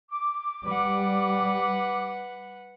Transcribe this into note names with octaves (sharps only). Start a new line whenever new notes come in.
D6
G3 B4 F#5